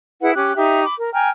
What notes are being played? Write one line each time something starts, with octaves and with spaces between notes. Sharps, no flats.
E4 G#4 B4 F#5
C#4 G4 D6 F#6
D#4 G4 E5
B5 D6
A#4
G5 G#5 A#5 F6